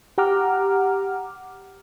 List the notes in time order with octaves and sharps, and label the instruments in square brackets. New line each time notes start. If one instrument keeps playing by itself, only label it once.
[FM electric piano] G4 F#5 A#5 D6 F6